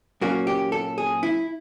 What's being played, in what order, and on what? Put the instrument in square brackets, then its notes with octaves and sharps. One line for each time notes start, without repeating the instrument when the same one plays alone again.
[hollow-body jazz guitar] A#2 F#3 A#3 C#4 F#4
G4
A4
G#4
E4